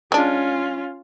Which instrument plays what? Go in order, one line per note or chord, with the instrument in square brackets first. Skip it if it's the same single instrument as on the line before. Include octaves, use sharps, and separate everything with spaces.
[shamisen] G#3 D4 [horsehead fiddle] C#4 F4